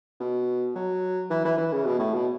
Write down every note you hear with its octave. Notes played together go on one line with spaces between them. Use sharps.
B2
F#3
E3
E3
E3
C#3
B2
A2
B2